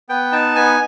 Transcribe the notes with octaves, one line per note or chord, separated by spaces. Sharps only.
B3 G5
D#4 A5
B3 G#5